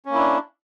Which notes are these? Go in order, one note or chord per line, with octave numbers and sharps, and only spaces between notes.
A#3 C#4 D4 E4